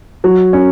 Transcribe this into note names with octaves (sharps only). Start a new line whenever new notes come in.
F#3
C#4